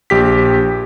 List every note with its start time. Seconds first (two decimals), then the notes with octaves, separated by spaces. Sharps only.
0.10 A#1 G4 B6